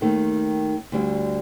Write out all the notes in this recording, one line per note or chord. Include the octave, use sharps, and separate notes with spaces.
D#2 D#3 A3
D2 D3 G3